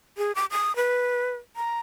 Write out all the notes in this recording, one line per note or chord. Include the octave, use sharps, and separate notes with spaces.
G#4
D6
D#6
B4
A#5